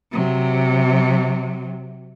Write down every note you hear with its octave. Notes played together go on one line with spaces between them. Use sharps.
C3 F#3